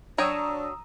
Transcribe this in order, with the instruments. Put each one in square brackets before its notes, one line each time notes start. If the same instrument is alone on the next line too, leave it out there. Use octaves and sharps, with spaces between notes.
[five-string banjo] F#3 C#5 G5 [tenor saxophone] D4 [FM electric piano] A#5 D#6 E6